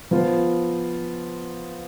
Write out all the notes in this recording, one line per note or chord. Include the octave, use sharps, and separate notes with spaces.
F3 B3 F4